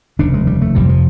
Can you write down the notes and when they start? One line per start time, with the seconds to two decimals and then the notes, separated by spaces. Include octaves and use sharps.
0.19 F1 D#2 C#3 D4
0.34 G#3
0.47 G3
0.62 A3
0.75 F1 F2 C3 G3
0.89 F3